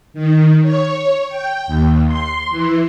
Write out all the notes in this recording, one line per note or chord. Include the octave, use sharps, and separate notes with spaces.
D#3
C#5
G5
D#2
C6
E3